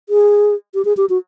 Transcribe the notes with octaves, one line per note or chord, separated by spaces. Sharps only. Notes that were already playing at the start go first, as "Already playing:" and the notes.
G#4
G4
G#4
G4
F#4